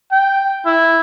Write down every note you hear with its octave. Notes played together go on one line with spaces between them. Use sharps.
G5
E4